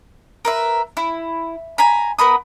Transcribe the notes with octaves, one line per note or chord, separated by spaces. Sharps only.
A#4 B4 E5
E4
G#5 A#5 B5
B3 A#4 B5 D#6